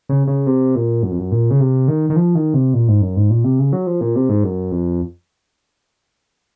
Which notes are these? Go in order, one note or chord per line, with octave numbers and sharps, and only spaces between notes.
C#3
C#3
C3
A#2
F#2
F2
F#2
A#2
C#3
C3
D#3
D#3
F3
D#3
C3
A#2
G#2
F#2
G#2
A#2
C3
C#3
F#3
F3
A#2
C3
G#2
F#2
F2